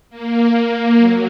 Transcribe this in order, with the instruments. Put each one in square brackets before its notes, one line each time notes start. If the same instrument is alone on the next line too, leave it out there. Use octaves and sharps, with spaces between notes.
[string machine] A#3
F#3